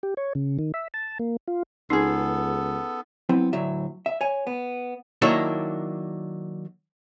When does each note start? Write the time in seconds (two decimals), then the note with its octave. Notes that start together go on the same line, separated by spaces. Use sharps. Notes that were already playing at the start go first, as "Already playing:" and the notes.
0.03 G4
0.17 C#5
0.35 C#3
0.59 D#3
0.74 E5
0.94 A5
1.19 A#3
1.48 F4
1.90 C#2 B3 C#4 D#4 G#4 A4
3.29 F#3 B3 C4 E4
3.53 D2 A2 F#3 E5
4.06 E5
4.21 C#5 G#5
4.47 B3
5.22 D#3 F#3 A#3 D4 E4 C#5